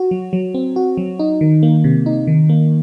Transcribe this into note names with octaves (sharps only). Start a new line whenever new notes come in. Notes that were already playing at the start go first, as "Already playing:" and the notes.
Already playing: F#4
F#3
F#3
C4
F#4
F#3
D#4
D#3
A#3
C3
D#4
D#3
A#3